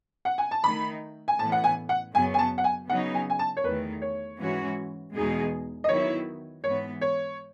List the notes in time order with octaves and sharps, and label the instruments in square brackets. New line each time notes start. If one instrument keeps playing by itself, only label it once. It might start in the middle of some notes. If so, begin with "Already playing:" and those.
[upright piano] F#5
G#5
A5
[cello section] D#3 A3 D#4 [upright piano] B5
[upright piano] G#5
[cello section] A2 E3 B3 [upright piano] A5
[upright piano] F#5
G#5
F#5
[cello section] F#2 C#3 F#3 B3 [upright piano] G#5
[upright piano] G#5
A5
F#5
G#5
[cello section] C#3 F#3 B3 D#4 [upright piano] F#5
[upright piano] G#5
G#5
A5
C#5
[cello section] E2 D#3 A3 [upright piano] B4
[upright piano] C#5
[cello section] G#2 E3 G#3 C#4 F#4
E2 B2 G#3 D#4 G#4
[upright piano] D#5
[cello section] D#3 F#3 B3 E4 [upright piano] C#5
[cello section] G#2 E3 B3 [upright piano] C#5
[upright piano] C#5